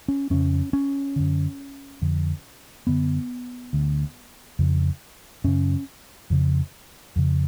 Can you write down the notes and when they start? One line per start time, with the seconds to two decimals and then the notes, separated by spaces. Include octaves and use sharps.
0.08 C#4
0.30 F2 C#3 C#4
0.73 C#4
1.16 F#2 D3
2.02 F2 D3
2.87 F#2 D3 B3
3.73 D2 D3
4.59 F2 C#3
5.44 F#2 C#3 C#4
6.30 F2 C#3
7.16 F2 C#3